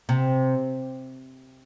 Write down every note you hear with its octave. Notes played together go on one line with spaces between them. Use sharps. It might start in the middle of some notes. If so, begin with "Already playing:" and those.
C3